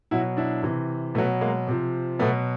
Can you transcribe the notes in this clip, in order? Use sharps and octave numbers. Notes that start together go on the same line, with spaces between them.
B2 F#3 E4 F#4
D4 E4
C3 E3
B2 F#3 A3 B3
G#3 A#3
C3 F3
B2 F#3 A3 B3